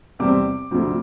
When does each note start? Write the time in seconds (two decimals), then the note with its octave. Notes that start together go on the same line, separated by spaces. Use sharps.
0.19 E2 C3 G3 C4 D6
0.71 D2 C3 F3 C4